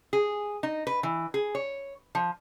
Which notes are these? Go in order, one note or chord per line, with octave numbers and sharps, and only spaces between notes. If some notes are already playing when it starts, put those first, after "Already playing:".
G#4
D#4
B4
E3
G#4
C#5
F3